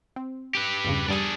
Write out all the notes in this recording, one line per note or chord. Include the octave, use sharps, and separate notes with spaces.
C4
G4 B4
E2 G2 C#3
G2 G3 D4 G#4 A5